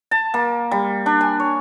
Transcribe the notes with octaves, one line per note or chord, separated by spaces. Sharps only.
A5
A#3
G3
D4
G#5
C#5